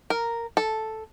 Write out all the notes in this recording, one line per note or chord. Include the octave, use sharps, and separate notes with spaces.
A#4
A4